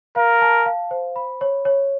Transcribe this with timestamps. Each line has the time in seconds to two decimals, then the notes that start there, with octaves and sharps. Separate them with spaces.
0.16 A#4 F5
0.42 A5
0.66 F5
0.91 C5
1.16 B5
1.41 C#5
1.65 C#5